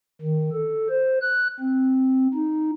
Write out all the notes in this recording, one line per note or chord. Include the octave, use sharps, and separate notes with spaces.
D#3
A4
C5
F#6
C4
D#4